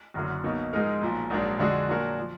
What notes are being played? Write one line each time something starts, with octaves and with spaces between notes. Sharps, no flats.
F#1 F#2 D3 F#3
B1 B2 A#3 D#4
G#2 F3 G#3 D#4 A#4
B1 A#2 F3
A#1 G#2 F#3 A#3 D4
F2 D3 G#3 D4 F#4
A#2 F#3 D4 F#4 A#4
F3